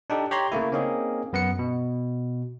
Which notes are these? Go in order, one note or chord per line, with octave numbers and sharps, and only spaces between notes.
D4 D#4 G4 A4
G4 C#5 A#5 C6
C#3 A3 A#3 E4
A#3 C4 C#4 D#4 G#4
F#2 B3 F#5 C#7
B2